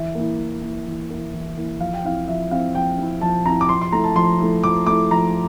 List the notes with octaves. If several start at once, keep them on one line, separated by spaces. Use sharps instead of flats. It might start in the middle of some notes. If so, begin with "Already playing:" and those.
Already playing: E3 E5
A#3 E4
E3
A#3 E4
E3
A#3 E4
E3
A#3 E4
F3 F5
G5
C4 E4 F5
F3 E5
C4 E4 F5
F3 G5
C4 E4
F3 A5
C4 E4 A#5
D6
F3 C6
C6
A3 E4 A#5
A5
F3 C6
A3 E4
F3 D6
A3 E4 D6
F3 A#5